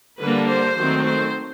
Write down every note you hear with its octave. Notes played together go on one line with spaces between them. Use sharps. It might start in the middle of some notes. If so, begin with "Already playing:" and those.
D3 G3 A#3 D4 B4
C5
D#3 F#3 A3 C4
C5